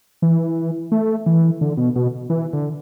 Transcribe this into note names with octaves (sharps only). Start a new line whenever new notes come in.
E3
A3
E3
D3
B2
B2
E3
D3